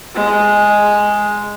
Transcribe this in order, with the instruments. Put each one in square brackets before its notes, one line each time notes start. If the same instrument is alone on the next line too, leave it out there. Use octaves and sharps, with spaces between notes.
[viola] G#3